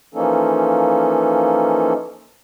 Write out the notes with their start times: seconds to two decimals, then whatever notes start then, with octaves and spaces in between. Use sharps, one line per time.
0.15 E3 F3 A#3 C#4 D#4 A4